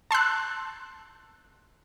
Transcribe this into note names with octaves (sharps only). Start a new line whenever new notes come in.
A5 C6 E6 F#6